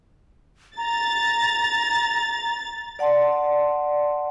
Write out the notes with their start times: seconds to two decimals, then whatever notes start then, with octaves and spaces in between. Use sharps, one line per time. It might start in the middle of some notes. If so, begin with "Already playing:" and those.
0.77 A#5 A6
2.99 D5 F#5 A5 C6